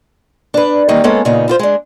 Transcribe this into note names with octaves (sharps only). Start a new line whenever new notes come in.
D4 B4
D#3 E3 G3 A#3 D#4
G#3 A#3 B3 C#4 A4
A#2 C#3 B3 D#4
E4 F4 C5
G#3 D4